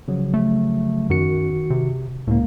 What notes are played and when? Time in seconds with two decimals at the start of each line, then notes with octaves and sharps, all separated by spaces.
0.08 C#3 F3 F#3
0.34 A3
1.10 F#2 D#3 F#4 C#7
1.70 C3
2.28 C#2 A2 A#3